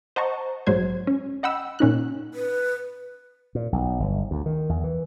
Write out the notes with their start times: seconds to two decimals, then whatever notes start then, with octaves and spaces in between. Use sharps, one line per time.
0.16 C5 D#5 F#5 A5 A#5 C#6
0.67 A#1 G#2 F#3 G#3 C5 G#6
1.07 C#4
1.43 D#5 F#5 G5 B5 E6
1.79 A#2 C#4 D#4 F#6
2.34 B4
3.55 A#2
3.72 B1
4.00 G1
4.31 D2
4.46 D#3
4.69 E2
4.84 E3